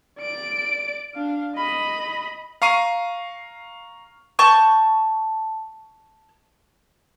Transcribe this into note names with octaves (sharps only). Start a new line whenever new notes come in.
D5 D7
D4 F5
D#5 B5
F5 A#5 C#6 C7 D#7
A5 C#6 G6